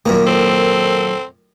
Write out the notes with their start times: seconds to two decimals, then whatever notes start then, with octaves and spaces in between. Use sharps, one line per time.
0.06 F#2 A#2 D#3 A#3
0.27 C4 A4